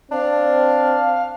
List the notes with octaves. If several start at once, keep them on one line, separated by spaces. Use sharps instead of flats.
C4 D4 F5